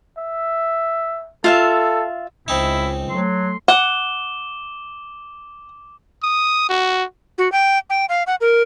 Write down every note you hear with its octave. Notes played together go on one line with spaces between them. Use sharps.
E5
F4 A4 E5 F5
C#2 C4 D#4 E4
F#3 A3 C6
F#5 D6 E7 G7
D#6
F#4
F#4
G5
G5
F5
F#5
A#4